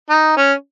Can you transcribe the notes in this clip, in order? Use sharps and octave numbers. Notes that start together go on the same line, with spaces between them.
D#4
C#4